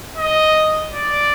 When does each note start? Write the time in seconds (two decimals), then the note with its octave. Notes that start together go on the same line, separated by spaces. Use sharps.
0.17 D#5
0.93 D5